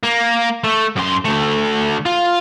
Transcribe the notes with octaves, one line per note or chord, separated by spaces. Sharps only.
A#3
A3
F#2 C6
D2 A3
F4